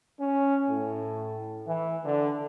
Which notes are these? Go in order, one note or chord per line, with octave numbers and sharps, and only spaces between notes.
C#4
A2
E3
D3